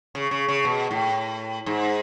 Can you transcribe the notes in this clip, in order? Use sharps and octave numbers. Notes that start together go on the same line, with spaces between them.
C#3
C#3
C#3
B2
A2
G#2